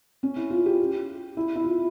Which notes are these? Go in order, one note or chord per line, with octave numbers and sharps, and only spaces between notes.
C#4
E4
F4
G4
E4
E4
F4